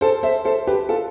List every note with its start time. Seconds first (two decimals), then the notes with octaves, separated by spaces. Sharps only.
0.01 A4 C5
0.23 C5 E5
0.45 A4 C5
0.67 G4 B4
0.89 F4 A4